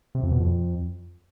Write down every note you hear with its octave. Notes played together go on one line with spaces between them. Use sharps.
C3
F2
B2
F2